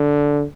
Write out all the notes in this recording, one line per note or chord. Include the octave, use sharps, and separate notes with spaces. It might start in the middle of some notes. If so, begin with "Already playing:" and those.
Already playing: D3